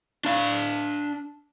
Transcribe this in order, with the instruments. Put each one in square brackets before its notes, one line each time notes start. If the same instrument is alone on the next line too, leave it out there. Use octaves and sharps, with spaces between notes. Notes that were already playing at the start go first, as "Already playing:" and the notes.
[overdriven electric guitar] D4 F5